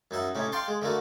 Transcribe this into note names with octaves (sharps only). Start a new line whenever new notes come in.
F#2 D#4 E5 F#5
A2 C3 C#4 D#4
F5 G5 A5 C6 D6
G#3
D3 A3 A#3 F#4